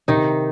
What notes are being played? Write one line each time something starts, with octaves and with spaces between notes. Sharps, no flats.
C3 D#3 D#4